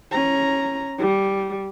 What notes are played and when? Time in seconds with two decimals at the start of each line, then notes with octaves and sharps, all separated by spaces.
0.11 C#4 A#5
0.98 G3